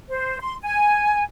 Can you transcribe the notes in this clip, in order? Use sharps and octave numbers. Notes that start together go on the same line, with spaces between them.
C5
C6
G#5